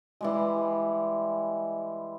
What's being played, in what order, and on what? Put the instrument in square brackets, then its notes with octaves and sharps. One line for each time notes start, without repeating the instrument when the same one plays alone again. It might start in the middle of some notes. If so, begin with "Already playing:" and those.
[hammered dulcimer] E3 G3 G#3